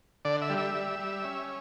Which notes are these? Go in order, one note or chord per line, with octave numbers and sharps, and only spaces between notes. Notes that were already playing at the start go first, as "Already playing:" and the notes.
D3 D5
E5
G3
E5
G3
G3
C#4